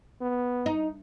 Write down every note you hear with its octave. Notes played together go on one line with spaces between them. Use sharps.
B3
D#4